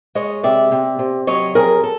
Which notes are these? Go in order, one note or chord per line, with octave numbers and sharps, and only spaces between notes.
G#3 C#5 D#5
C3 D5 E5
C3
C3
F#3 C#5 D#5
F2 G#4 A#4
A4